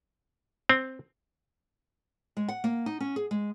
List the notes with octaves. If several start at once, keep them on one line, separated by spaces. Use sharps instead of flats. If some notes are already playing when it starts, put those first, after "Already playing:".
C4
G#3
F#5
A#3
D#4
C#4
G#4
G#3